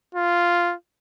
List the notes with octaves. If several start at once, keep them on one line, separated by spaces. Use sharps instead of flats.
F4